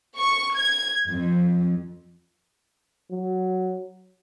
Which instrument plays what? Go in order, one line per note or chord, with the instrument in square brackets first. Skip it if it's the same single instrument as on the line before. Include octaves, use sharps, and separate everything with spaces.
[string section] C#6
G#6
F2
[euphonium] F#3